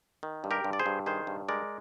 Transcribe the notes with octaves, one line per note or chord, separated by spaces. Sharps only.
D#3
G2
G4 A#4
G2
D5
G#4 C5
G2
D#3 G#4 C5
G2
G#3 A#4 D5